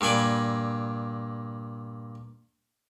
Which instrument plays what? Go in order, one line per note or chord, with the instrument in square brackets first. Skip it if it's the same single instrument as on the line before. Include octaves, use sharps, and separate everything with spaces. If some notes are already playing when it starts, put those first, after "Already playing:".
[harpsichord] G2 A#2 G#5 B5 D6